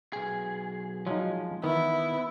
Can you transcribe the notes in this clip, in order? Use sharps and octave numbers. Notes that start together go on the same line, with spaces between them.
B1 G#4
F3 F#3 G#3 D#4
D#3 E3 B3 E4